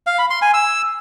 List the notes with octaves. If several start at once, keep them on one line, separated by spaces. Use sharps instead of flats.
F5
B5
C6
G#5
E6